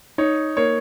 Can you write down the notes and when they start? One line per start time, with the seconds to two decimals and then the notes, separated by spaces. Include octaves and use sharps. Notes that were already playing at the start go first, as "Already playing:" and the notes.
0.18 D#4 C#5
0.57 A#3 C#5